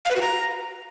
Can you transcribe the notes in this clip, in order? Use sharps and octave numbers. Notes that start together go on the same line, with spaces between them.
F5
B4
F#4
A#5